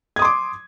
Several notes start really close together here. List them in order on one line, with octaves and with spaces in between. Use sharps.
G#6 D#6 C6 D6